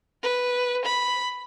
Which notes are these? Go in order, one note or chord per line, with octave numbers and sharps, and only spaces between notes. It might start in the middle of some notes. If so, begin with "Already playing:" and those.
B4
B5